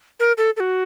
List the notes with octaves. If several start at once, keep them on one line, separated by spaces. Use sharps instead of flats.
A#4
A4
A4
F#4